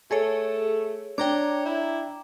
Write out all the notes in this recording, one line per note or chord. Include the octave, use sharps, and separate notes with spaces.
A3 G#4 A4 C#5
D4 C#5 G5 A#5 D6
E4